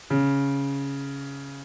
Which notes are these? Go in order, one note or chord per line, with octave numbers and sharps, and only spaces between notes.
C#3